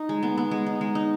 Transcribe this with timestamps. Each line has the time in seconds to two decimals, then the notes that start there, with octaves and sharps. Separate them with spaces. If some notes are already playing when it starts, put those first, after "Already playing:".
Already playing: D#4
0.09 G#3
0.23 B3
0.37 B3
0.51 G#3
0.66 D#4
0.81 G#3
0.95 D#4